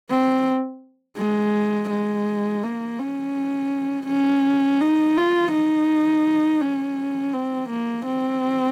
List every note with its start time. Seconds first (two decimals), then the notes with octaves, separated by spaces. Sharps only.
0.10 C4
1.18 G#3
1.90 G#3
2.63 A#3
2.99 C#4
4.08 C#4
4.81 D#4
5.17 F4
5.52 D#4
6.61 C#4
7.34 C4
7.70 A#3
8.06 C4